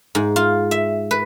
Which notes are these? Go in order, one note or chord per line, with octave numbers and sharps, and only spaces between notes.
G#2
F4
E5
B4